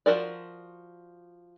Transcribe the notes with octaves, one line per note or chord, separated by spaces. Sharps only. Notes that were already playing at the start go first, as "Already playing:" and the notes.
F3 F#4 A#4 D5